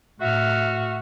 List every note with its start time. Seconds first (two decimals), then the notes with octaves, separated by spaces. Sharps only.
0.21 A2 F#4 E5 F6